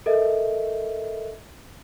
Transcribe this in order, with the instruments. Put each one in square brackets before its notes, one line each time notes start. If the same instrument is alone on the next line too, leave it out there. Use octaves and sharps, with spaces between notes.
[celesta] A4 A#4 D#5 E5